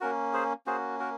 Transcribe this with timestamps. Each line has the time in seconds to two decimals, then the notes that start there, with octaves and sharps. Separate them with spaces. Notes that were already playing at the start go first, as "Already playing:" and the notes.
0.01 A#3 C#4 F#4 A#4
0.33 G#4 C5
0.66 A#3 C#4 F#4 G#4 C5
1.00 F#4 A#4